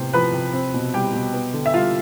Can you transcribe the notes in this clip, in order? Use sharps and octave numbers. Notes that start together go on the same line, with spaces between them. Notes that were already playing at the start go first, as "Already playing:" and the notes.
Already playing: A2 C3 B3 C5
F3 B4 B5
C3
C4
B2
G3 G4 G5
B2
B3
D3
E5
G3 F4 F5